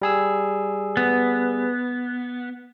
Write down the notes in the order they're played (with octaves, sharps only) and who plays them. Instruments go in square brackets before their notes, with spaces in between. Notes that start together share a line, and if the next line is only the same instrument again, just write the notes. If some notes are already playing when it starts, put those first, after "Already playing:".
[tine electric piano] G3 G#4 E6
[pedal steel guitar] B3